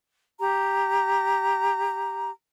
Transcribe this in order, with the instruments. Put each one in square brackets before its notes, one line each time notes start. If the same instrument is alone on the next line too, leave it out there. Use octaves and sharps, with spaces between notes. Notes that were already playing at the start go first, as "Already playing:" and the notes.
[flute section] G4 A#5